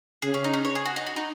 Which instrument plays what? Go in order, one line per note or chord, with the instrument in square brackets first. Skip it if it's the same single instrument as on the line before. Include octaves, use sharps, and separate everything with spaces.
[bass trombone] C#3 [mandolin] G#4
[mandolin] C#4
D#4
C#4
C#5
G#4
F#4
D#4
F#4
D#4